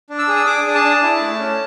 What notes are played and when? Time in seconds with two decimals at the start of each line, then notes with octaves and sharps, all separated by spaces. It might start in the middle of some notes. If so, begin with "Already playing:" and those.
0.10 D4
0.19 E6
0.28 G#4
0.36 E6
0.46 G#4 D6
0.66 D4
0.75 A5
0.84 D4
1.03 E4
1.22 A3
1.39 C#4